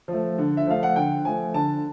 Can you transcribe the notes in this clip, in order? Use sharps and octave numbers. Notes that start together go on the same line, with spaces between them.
F3 A3
D3
E5
F3 A3 F5
F#5
D3 G5
F3 A3 G#5
D3 A5